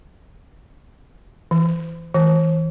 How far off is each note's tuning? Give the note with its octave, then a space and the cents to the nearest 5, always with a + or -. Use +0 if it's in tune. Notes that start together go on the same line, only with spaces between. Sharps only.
E3 +0
E3 -30